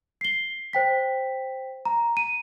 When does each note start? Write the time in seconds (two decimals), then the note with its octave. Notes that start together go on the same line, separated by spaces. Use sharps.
0.21 C7 G7
0.73 C5 G5 B6
1.85 A#5
2.17 D#7